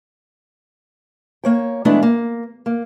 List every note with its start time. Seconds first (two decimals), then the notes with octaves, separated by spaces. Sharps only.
1.44 A#3 C#5 G5
1.85 E3 G#3 A3 B3 D4 E4
2.03 A#3
2.66 A#3